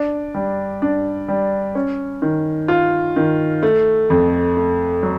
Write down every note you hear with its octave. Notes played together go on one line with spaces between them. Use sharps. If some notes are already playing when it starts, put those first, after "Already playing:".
Already playing: D4
G3
D4
G3
C#4
D#3
F4
D#3
A3
F2
A3
F#3